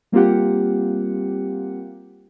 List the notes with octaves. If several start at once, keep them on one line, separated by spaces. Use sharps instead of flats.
G3 A#3 C4 F4 G4 F#5